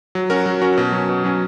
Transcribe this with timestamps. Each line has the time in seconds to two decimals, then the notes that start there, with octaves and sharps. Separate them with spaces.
0.15 F#3
0.30 C#4 F#4 A#4
0.46 F#3
0.62 C#4 F#4 A#4
0.77 B2
0.92 F#3 C#4
1.09 B2
1.24 F#3 C#4